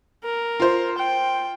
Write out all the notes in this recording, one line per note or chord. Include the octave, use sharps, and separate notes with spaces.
A#4
F4 C5
G5